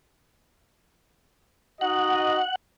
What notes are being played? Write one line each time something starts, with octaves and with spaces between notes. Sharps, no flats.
D#4 F#4 D#5 F#5